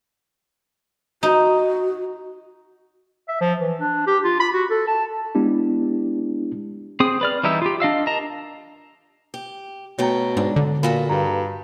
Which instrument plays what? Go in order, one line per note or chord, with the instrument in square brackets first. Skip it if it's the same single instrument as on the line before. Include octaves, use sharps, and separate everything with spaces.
[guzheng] D#4 [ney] F#4
[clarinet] E5
F3
E3
D4
G4
F4
B5
F#4
A4
A5
[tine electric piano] G#3 B3 D4 E4 G4
[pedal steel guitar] C4 G#4 D#6
B4 D5 F6
E3 G3 D#4 E4 E6
F4 G4
D4 D#5 F5 E6
A#4 D#5 A5 A#5
[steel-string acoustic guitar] G4
[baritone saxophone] B2 [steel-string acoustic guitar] A3 B3 G5 [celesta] C#5 A#5
[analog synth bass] G#2 [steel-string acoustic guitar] D4
[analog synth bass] D3
[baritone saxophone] A#2 [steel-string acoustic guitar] F#4 A4 B4 [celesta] B5
[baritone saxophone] G2 [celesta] F5 A#5